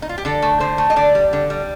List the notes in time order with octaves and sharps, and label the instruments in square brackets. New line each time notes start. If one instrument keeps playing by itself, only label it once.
[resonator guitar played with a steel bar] D#4
F4
G4
D3 A4
A3
D3 C5
A3
D#5
D3 D5
G3
D3
G3